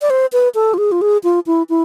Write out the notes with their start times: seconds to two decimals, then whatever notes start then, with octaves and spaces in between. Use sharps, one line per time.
0.02 D5
0.10 C5
0.33 B4
0.55 A4
0.74 F4
0.78 G#4
0.92 F4
1.01 G#4
1.24 F4
1.47 E4
1.69 E4